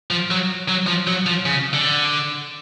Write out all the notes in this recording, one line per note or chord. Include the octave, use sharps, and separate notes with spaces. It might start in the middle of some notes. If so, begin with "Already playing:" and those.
F3
F#3
F#3
F3
F#3
F3
C#3
D3